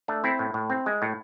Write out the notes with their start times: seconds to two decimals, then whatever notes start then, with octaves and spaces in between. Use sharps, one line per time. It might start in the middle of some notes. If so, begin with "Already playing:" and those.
0.08 A3 D4
0.24 C4 E4
0.39 A2
0.54 A2
0.70 C4
0.86 G#3
1.02 A2